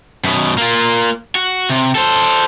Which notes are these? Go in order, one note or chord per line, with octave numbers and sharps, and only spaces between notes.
F#2 B2
A#3 F4
F#4
C3
A4 C5